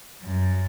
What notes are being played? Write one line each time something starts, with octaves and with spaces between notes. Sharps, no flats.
F#2